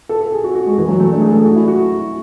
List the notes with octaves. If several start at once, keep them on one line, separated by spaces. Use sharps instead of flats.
A4
A4
G#4
F#4
F#4
G#3
E3
F#3
A3
D4
G#4
A4
G#4
F#4
E4
F#4